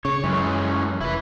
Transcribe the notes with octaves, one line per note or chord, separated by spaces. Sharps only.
C#3 C#5
F#2 E3 G#3 C#4
F1 E4 B4